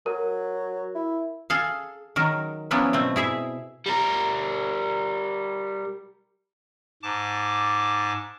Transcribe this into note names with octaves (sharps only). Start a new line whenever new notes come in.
F#3 A#4
E4
G#4 A4 F5
D#3 F#3 A#4
F3 F#3 B3 C#4 D4 E4
B2 A3 C4
E4 G#4 E5
G3 A#4
G#2 A5 D6